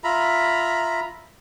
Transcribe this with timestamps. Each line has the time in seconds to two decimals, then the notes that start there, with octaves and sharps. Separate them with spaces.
0.04 F4 E5 A#5 B5